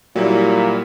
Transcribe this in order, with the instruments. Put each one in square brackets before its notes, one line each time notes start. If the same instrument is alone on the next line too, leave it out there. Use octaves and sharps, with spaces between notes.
[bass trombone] A#2 [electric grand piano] F#3 G3 E4